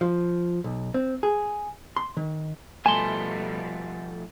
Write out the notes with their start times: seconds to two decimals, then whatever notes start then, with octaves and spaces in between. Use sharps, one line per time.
0.01 F3
0.64 B1
0.94 C4
1.23 G#4
1.97 C6
2.17 D#3
2.86 B2 F3 G3 A3 G#5 A5 C6